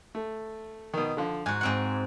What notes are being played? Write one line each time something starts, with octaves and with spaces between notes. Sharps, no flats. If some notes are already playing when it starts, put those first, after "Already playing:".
A3
B2 D#3
D3 F3
G#2 F#4 G#5
G#2 C4 F#5